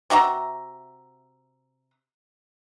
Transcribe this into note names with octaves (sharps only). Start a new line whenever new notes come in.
C3 F#4 E5 A#5